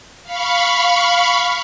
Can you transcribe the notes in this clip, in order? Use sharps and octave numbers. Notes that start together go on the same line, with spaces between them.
F5 B5 C#6